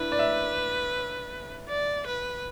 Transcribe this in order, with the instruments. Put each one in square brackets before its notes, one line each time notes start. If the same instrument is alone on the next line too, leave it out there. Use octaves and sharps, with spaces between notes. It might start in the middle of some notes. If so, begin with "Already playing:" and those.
Already playing: [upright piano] D4 E4 [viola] B4
[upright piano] D5
E5
[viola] D5
B4